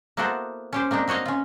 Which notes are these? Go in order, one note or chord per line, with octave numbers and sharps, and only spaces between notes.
A#3 B3 E4 F#4 A4 C5
C#4 G4 C5
A#3 C4 D4 D#4
C4 F#4 C#5 D#5 F5
C#4 F4